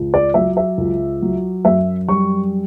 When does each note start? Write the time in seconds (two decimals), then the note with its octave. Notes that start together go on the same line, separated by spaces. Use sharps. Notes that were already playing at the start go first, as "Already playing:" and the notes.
Already playing: C#2
0.14 D5
0.34 F#3 E5
0.57 E5
0.78 C#2
1.22 F#3
1.65 F#2 E5
2.08 G3 C#6